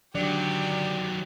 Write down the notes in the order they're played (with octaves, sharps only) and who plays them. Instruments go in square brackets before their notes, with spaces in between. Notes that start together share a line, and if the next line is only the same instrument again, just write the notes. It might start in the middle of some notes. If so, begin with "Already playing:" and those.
[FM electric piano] D3 D5 [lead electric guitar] D#3 F#3 [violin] G4